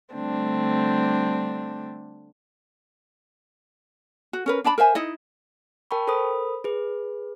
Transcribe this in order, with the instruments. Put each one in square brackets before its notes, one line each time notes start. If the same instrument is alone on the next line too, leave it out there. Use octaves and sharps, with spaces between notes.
[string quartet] D3 G3 A3 C4 D4
[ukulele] F#4
C#4 A#4 B4
D4 D5 A5 B5
A#4 C5 E5 G#5
D#4 E4 D#5
[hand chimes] A#4 G5 A5 B5 C#6
A4 A#4 C5 B5 D#6
G#4 B4